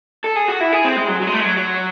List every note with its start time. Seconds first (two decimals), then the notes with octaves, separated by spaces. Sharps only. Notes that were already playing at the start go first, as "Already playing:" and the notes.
0.24 A4
0.36 G#4
0.48 F#4
0.61 E4
0.73 G#4
0.85 C4
0.96 G#3
1.08 F#3
1.21 F#3
1.27 G#3
1.33 A3
1.40 G#3
1.44 F#3
1.57 F#3